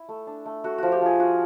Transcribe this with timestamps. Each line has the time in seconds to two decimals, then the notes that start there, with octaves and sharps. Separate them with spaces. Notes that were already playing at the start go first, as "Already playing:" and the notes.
Already playing: E4
0.08 A3
0.27 D4
0.46 A3
0.64 A3 F#4
0.78 F3 F#4
0.92 G4
1.01 F3 G#4
1.19 F4 F#4